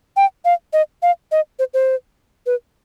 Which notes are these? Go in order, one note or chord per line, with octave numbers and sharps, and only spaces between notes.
G5
F5
D#5
F5
D#5
C5
C5
B4